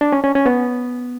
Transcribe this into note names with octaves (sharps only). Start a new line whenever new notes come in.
D4
C#4
C#4
C#4
B3